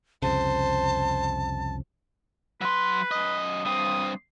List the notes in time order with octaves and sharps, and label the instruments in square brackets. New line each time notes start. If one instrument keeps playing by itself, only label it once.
[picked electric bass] C2 F2 C#3 [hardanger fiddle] C5 [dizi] A5
[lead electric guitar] F#3 C6 [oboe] B4
[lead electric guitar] F#2 D#5
[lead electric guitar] G2 C4 [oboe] D#6